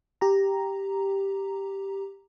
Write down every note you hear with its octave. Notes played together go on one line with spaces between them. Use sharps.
G4 A#5